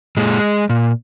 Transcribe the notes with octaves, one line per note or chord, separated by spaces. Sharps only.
A#2 G#3
A#2